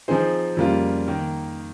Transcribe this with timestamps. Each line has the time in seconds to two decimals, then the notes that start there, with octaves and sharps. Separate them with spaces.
0.08 F3 C4 D#4 G#4 C5
0.57 F2 C#3 G3 A#3 F4
1.08 D#3 A#3